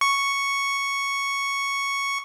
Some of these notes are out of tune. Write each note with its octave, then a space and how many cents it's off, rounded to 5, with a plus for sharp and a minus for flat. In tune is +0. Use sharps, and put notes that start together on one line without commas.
C#6 +0